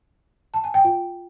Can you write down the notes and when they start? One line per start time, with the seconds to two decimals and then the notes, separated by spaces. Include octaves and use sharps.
0.54 A5
0.64 G#5
0.74 G5
0.84 F4